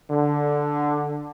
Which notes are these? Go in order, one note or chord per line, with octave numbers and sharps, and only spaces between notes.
D3